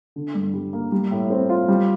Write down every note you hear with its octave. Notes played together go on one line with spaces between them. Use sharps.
D3
G2
G3
A#3
G3
A2
C4
F4
G3